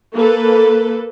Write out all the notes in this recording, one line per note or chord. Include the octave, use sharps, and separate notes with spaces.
A#3 A4 B4